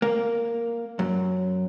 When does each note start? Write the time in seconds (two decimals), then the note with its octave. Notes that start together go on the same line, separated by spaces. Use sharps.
0.02 A#3
0.99 F#2